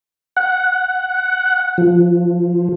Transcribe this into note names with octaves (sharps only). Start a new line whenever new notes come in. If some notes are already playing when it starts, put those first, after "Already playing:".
F#5
F3